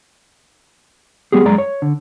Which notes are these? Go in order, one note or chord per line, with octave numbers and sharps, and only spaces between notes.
G3 B3 G4 G#4
F#2 G#3 D5 A#5
C#5
D3